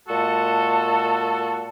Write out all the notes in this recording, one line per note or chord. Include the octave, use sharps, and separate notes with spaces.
A#2 G#3 F#4 A4 A5